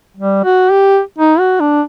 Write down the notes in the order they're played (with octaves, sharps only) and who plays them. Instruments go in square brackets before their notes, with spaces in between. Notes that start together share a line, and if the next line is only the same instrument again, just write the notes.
[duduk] G3
F#4
G4
D#4
F#4
D4